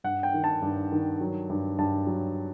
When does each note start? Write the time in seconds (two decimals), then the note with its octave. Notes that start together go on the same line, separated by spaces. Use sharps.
0.04 G2 F#5
0.23 G5
0.34 D#3
0.44 A5
0.62 G2
0.92 D#3
1.21 F#3
1.50 G2
1.79 G2 A5
2.07 F#3